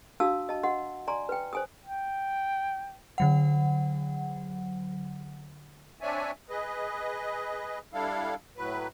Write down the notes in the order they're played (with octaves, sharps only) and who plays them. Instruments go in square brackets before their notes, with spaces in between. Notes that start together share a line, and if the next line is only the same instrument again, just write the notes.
[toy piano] D4 F#4 F5 A5 D#6 E6
D#5 A5
D#5 F#5 C6
D5 G#5 A#5 C6
B4 G5
C5 G#5 D#6
[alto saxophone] G5
[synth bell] D3 F#3 F#5
[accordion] C4 D4 C#5 D5 E5 G#5
G#4 B4 D#5
G3 D4 E4 A4 F5
A2 F#3 B4